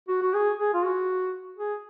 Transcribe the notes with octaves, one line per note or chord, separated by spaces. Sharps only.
F#4
F#4
G#4
G#4
F4
F#4
G#4